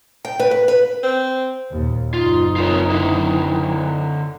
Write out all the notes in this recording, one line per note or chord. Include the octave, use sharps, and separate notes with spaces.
G5
B4
B4
B4
C4
D#2 A#2
F#1 D#4 F4
F4 A#4 C#5
D3 E4